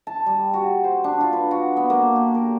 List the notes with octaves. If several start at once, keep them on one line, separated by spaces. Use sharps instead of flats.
A5
G3
F#4
C5
D4
F4
B4
F#4
B3
A#3
G4
A#4